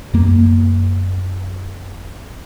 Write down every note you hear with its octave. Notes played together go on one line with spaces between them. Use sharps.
F#2 A#3